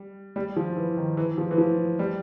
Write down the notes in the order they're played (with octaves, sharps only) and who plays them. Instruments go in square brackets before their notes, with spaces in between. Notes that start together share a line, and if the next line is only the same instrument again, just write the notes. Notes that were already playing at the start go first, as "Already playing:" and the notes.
Already playing: [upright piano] G3
G3
F3
E3
D#3
E3
F3
E3
F3
G3